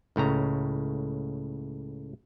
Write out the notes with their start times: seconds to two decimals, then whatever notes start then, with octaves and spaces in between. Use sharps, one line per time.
0.16 C#2 A2 C#3 A#5